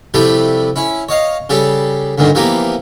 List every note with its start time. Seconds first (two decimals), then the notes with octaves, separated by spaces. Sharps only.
0.14 C3 F3 G3 A3 E4 G4
0.76 C#4 E4
1.09 C#5 D#5 F5
1.50 C#3 G3 G4 A4
2.18 D2 G2 A#2 D3 D#3
2.35 E3 F3 A#3 B3 G4 A#4